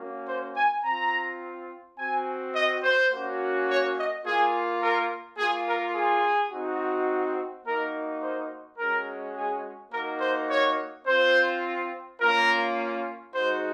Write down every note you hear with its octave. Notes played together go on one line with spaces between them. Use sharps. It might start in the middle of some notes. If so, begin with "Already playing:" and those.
Already playing: A#3 C#4 F#4
C5
G#5
C4 F4 A#5
C4 F#4 G#5
D#5
C5
A#3 C#4 F#4
C#5
D#5
A#3 F4 G#4
A#4
A#3 F4 G#4
A#4
G#4
C4 D#4 F#4
A#3 D#4 F#4 A#4
C5
G#3 C#4 F#4 A#4
G#4
A#3 D#4 F#4 A#4
C5
C#5
C4 F4 C5
A#3 C#4 F4 A#4
G#3 D#4 F#4 C5